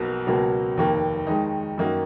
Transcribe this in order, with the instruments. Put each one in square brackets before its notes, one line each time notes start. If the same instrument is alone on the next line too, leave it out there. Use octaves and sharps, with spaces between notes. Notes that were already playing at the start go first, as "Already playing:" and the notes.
Already playing: [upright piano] B1 B2 A#3
C#2 B2 F#3 A#3
F1 D#2 D#3 A#3
D#2 D#3 G#3 D#4
F#2 D#3 A#3 D#4 F#4